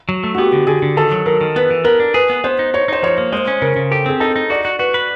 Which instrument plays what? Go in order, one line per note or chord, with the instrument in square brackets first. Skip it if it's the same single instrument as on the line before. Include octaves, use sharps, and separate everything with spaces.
[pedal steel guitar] F#3
A3
[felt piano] F#4
[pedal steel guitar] B3 [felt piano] G4
[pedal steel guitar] D3
[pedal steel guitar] D3 [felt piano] G#4
[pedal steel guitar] D3
[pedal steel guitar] D#3 [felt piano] A4
[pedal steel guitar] F#3
[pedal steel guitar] D#3 [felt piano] A#4
[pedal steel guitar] D#3
[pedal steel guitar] B3 [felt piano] B4
[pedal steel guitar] E3
[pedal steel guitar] B3 [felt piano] A#4
[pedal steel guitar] D4
[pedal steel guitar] G#4 [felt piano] B4
[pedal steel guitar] B3
[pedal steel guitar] B3 [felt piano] C5
[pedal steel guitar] D#4
[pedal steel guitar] D#4 [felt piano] C#5
[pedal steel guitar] D#4 [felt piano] C5
[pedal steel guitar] F3 [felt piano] C#5
[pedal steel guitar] A#3
[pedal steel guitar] G#3 [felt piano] C5
[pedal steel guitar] C#4
[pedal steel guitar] C#3 [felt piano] A#4
[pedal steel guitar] C#3
[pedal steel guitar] G4 [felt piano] A4
[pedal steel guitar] C4 [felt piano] G#4
[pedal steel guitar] D#4 [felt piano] A4
[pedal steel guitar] D#4
[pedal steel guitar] F#4 [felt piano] D5
[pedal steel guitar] F#4
[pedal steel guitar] F#4 [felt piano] B4
[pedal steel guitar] B4